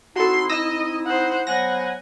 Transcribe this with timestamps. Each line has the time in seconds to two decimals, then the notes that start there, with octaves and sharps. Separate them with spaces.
0.16 C4 D#4 E4 F#4 A4 C6
0.49 D#5 D#6 E6 A#6
1.05 C5 F#5
1.47 F#3 B3 C5 F#5 G#5 A#6